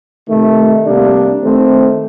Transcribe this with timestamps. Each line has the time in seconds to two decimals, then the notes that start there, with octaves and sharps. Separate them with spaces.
0.28 C3 D#3 A3
0.84 C3 G3 A#3 D4
1.42 D#3 A3 C4